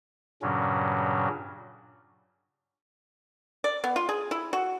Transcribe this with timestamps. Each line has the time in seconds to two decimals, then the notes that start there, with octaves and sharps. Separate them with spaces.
0.42 G2 A#2 C#3 F#3 C#4
3.64 D5
3.84 B3
3.96 F4
4.09 G#4
4.31 E4
4.53 F#4